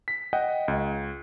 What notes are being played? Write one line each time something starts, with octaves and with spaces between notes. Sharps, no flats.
B6
D#5 F#5 G5
C#2